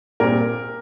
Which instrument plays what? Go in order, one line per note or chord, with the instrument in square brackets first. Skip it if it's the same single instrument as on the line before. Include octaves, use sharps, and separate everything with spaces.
[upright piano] A#2 G3 C4 A#4